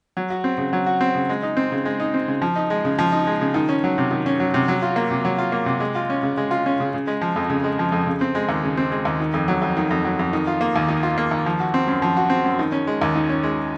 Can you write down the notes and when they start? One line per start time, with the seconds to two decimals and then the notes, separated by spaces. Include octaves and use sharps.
0.17 F#3
0.30 F#4
0.44 C4
0.58 C#3
0.73 F#3
0.86 F#4
1.01 C4
1.15 C#3
1.29 G#3
1.43 D#4
1.57 C4
1.72 C#3
1.85 G#3
2.00 D#4
2.14 C4
2.28 C#3
2.42 F3
2.56 D#4
2.70 G#3
2.85 C#3
2.99 F3
3.12 D#4
3.27 G#3
3.41 C#3
3.54 D#3
3.69 C#4
3.84 F#3
3.98 C3
4.11 D#3
4.26 C#4
4.40 F#3
4.54 C3
4.68 F#3
4.82 F4
4.96 A#3
5.11 C3
5.25 F#3
5.38 F4
5.52 A#3
5.66 C3
5.80 G#3
5.95 F4
6.10 C#4
6.23 C#3
6.37 G#3
6.51 F4
6.66 C#4
6.80 C#3
6.94 C#3
7.07 G#3
7.21 F3
7.36 F2
7.50 C#3
7.64 G#3
7.79 F3
7.92 F2
8.06 C#3
8.21 C4
8.35 G#3
8.49 D#2
8.64 C#3
8.77 C4
8.91 G#3
9.05 D#2
9.20 D#3
9.34 F2
9.48 F#3
9.62 F2
9.77 D#3
9.90 F2
10.05 F#3
10.19 F2
10.33 D#3
10.47 F4
10.61 A#3
10.76 D#2
10.89 D#3
11.03 F4
11.18 A#3
11.31 D#2
11.46 F3
11.60 F#4
11.74 C4
11.88 F#2
12.02 F3
12.17 F#4
12.30 C4
12.45 F#2
12.59 D#3
12.72 C#4
12.87 G#3
13.02 D#2
13.16 D#3
13.29 C#4
13.43 G#3